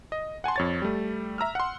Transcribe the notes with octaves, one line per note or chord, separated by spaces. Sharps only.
D#5
F#5 G#5 A5 C6
F2 C#5 A6
G3 A3
E5 A#5 E6 F6
F#5 C6